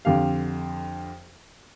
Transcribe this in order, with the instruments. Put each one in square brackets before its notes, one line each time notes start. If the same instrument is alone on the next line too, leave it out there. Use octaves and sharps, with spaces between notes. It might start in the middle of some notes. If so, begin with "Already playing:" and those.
[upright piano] F2 D3 G4 F5